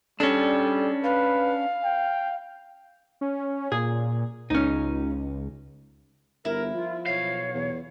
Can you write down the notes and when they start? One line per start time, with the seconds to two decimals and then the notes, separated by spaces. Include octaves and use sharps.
0.20 G3 C#4 D4 A4
1.04 B4 F5
1.84 G5
3.21 C#4
3.72 A#2 G#4
4.50 C#2 C#4 D#4
6.45 G1 E4 A#4
6.74 F3 F4
7.06 B1 C#5 F5
7.54 E2